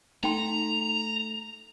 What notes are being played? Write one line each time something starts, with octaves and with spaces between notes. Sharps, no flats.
A3 D#4 G5 A#5 C6 F7